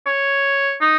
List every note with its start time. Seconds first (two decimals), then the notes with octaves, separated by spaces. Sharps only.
0.06 C#5
0.81 D#4